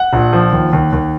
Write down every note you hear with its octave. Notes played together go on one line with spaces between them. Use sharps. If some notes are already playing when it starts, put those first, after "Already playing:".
Already playing: F#5
A#1
F3
D#2
D#2
D#2